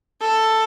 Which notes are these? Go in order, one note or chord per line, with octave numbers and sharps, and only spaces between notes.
A4